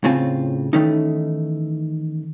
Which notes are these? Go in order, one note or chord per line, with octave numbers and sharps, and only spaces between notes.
A2 C#3 C4 F4 G#5
D#3 E3 A3 C#4 D#4